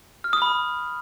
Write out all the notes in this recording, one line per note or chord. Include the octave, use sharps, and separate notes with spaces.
F6
D#6
B5